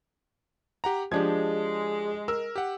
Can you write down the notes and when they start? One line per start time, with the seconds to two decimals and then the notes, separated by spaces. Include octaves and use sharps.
0.84 G4 F#5 A#5
1.12 F3 G#3 D4 G4 G#6
2.28 A#4 E6
2.56 G4 F#5